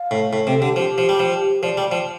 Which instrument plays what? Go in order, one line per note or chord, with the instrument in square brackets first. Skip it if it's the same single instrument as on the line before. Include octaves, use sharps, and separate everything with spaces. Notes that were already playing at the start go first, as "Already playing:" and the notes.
Already playing: [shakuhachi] F5
[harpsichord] A2
A2
[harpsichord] C3 [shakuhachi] A4
[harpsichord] D3 [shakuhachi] G4
[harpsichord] F3 [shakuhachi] G4
[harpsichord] F3
G3
F3
[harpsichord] F3 [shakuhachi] D5
[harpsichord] G3
F3